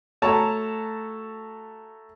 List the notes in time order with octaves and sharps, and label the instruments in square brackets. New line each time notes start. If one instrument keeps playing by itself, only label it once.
[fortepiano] A3 F#4 C#5 A5 A#5